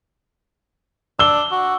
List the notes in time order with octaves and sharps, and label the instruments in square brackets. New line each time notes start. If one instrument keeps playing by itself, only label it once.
[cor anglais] D4 [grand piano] E6 G7
[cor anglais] F#4